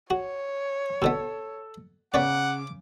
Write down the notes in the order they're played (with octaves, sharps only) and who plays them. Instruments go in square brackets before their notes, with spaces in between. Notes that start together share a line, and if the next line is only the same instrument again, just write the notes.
[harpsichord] F#4 [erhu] C#5
[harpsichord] B2 D3 B3 [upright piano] A4 E6
[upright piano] C#3 [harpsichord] B3 C#5 D5 [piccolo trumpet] F#5 [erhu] D6